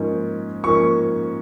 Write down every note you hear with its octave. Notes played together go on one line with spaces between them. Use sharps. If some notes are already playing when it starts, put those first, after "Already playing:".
Already playing: G#2 F3 A#3 C#4
G#2 F3 A#3 C#4 C#6